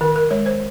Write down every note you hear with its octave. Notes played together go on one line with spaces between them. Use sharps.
D#3 A#4
A#4
G#3 C#5
C5